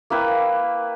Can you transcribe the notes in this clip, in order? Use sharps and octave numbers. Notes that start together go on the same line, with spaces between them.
A#3 E4 B4 G5